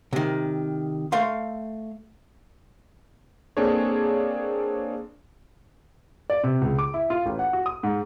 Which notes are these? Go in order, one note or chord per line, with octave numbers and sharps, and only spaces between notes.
C3 D#3
A3 F5 C6
A#3 C4 D4 G#4 A4 C#5
D5
C3
C#2
D6
E4
F4
A1
F#5
F#4
D#6
G#2